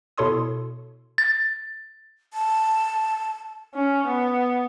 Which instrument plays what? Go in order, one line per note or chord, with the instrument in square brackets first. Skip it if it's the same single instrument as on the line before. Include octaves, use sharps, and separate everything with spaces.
[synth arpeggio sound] B2 E4 A4 C#5 C6 D#6
[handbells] A6
[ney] A5
[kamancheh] C#4
B3